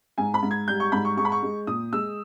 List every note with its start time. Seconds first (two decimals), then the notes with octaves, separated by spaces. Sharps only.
0.18 G#2 G#5
0.34 B5
0.43 G#2
0.51 G#6
0.68 G3 G6
0.80 C#6
0.92 G#2 B5
1.05 C#6
1.17 G#3 C#6
1.25 B5
1.32 C#6
1.43 G#3
1.67 A#2 D#6
1.93 G#3 E6